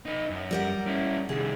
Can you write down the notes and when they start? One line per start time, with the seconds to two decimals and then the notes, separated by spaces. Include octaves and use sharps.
0.06 D#4 B4
0.30 F#2
0.51 G3 A#4 F#5
0.87 C#4 E4
1.29 C2 D#3 G#4